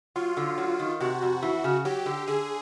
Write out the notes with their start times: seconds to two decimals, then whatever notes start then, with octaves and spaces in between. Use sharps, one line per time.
0.16 F#3 F4
0.37 D3
0.58 F#3
0.79 D#3
1.00 C3 F#4
1.22 F2
1.43 E3
1.64 C#3
1.85 F#3 G4
2.06 D3
2.27 D3 G#4